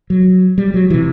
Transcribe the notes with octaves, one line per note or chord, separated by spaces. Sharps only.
F#3
G3
F#3
C3 E3